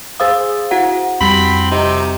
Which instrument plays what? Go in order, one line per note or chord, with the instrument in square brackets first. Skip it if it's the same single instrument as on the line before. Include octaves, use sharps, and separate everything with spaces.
[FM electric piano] G#4 C5 F5 [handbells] D#6 E6 A6
[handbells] E4 F#4 F#5
[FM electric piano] F2 G3 [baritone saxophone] C4 [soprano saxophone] B5
[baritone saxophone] C3 [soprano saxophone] D#4